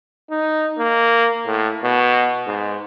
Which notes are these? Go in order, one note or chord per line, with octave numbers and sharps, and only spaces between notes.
D#4
A#3
A2
B2
G#2